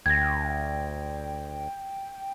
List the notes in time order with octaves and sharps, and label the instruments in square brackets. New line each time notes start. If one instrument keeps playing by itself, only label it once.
[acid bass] D2 [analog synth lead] G5 [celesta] G#6 A#6